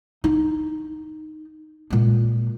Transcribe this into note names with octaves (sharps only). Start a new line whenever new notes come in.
D#4
A#2 G#3